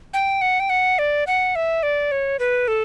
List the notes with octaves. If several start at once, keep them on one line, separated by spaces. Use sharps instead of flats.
G5
F#5
G5
F#5
D5
F#5
E5
D5
C#5
B4
A4